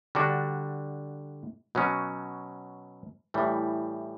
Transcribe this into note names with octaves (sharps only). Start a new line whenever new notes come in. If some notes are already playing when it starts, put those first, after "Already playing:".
D3 G3 D4 F#4
B2 F#3 C#4
A2 E3 G3